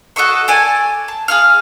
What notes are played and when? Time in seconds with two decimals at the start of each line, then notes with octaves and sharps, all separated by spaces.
0.16 F#4 A4 D#5 C#6
0.48 A4 D5 G#5 A5
1.08 A5
1.28 G#4 F5 F6